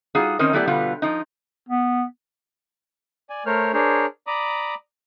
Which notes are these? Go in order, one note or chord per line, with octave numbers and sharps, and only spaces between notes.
G3 D#4 F4 F#4 G#4
D#3 C4 C#4 D#4 A#4
F#3 A3 B3 E4 G4 D5
B2 D3 G3 B3 F4
F3 D#4
B3
D5 G#5
A3 A#4 C5 C#5 F6
D4 G#4 A#4 C5 C#5
D5 A#5 B5 D6 D#6